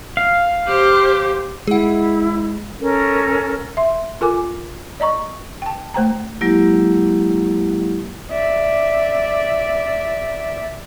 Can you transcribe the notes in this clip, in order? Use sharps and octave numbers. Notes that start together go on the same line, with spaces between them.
F5
G4 C5
G#3 E4 G#4 F#5
C#4 A4 A#4
E5 C6
F4 A4 A#4 G#5 D6
D5 D#5 A#5 C#6
G5 A5
A3 C5 G5 A#5
F#3 G#3 A#3 E4 G4
D5 E5